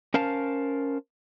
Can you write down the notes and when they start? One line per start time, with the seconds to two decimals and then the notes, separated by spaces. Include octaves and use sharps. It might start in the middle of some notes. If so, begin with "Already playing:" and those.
0.14 C#4 A#4 C5 F5 A5